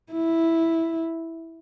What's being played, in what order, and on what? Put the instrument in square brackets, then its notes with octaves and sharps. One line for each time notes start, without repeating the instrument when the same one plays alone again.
[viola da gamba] E4